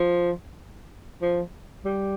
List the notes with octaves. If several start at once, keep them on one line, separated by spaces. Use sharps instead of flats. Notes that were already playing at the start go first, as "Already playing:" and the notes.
Already playing: F3
F3
G3